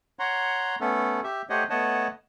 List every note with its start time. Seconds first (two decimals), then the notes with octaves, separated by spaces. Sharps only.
0.19 C#5 F#5 A#5 C6
0.81 A3 B3 C#4 A4
1.24 G4 E5
1.50 A3 G4 C5 C#5 D#5 F#5
1.70 A3 B3 C#5 D#5 F#5 A5